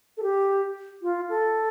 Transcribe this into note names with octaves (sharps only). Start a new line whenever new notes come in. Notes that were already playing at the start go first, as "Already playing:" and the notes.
A4
G4
F4
A4